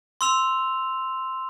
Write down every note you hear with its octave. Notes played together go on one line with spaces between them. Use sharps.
C6 E6 F7